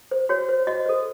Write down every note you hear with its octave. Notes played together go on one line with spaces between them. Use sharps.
C5
F#4 C#5
C5
F#4 D#5
A4 C5